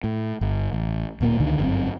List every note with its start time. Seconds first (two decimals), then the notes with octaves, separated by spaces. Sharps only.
0.04 A2
0.41 G1
0.73 A1
1.21 D1 A#2 A3 A#3
1.40 C#2 D3 D#3
1.59 G1 F#2 C4